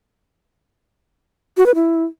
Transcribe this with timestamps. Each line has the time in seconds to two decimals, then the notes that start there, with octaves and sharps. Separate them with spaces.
1.57 F#4
1.66 B4
1.75 E4